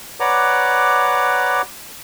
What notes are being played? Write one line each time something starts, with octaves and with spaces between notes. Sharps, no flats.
B4 C#5 D5 F#5 A#5 D6